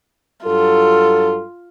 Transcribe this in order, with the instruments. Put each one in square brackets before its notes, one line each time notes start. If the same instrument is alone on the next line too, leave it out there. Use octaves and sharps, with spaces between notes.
[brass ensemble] G2 F#3 A4 [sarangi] F4